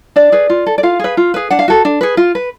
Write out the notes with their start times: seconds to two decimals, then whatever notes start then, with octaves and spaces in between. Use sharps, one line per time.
0.16 D4 D5
0.32 G#4 B4
0.50 F4
0.67 A4
0.78 D5
0.83 F4 F5
0.99 G#4 B4
1.17 F4
1.34 G#4 B4
1.51 D4 F#5
1.59 F5
1.68 F#4 A4
1.85 D4
2.01 G#4 B4
2.17 F4
2.35 B4